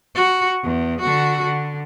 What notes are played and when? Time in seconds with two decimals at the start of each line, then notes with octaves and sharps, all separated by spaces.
0.15 F#4
0.63 E2
1.01 D3 F#4
1.42 D3